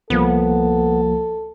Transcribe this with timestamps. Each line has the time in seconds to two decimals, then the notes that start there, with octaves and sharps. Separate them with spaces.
0.10 C2 F3 A#3 B3 A4